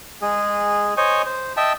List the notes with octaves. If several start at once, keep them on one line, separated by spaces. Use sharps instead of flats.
G#3 G#4
C5 C#5 D#5 G#5
C5
D#5 E5 G5 A5